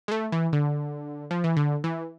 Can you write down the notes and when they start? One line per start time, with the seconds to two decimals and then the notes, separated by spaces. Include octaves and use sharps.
0.08 G#3
0.11 A3
0.32 E3
0.53 D3
1.31 F3
1.44 E3
1.57 D3
1.84 E3